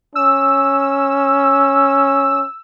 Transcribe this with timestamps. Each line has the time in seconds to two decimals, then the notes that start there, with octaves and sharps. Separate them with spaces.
0.15 C#4 E6